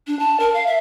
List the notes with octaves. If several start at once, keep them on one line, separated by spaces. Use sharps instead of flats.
D4
A5
A#4
F5
E5